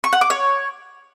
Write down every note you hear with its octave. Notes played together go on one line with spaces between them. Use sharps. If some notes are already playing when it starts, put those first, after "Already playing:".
C#6
F#5
D6
C#5